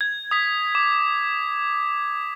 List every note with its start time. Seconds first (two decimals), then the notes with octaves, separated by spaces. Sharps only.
0.01 G#6
0.31 D#6 B6
0.75 D6